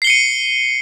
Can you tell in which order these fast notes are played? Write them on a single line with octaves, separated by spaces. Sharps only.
C7 G7 C#7 D#7